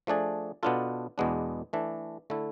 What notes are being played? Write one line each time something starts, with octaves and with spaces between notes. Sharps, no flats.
F3 A3 D4 G#4 D5
B2 B3 D4 F4 A4
E2 B2 G#3 B3 D4
E3 A3 D4 A4
D3 A3 E4 A4